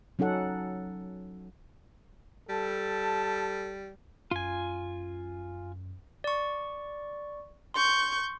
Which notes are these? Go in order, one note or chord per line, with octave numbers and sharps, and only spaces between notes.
F#3 C#4 D#4 A4 F#5
G3 A4 A5
F#2 F4 G#5
D5 C#6
C6 C#6 G6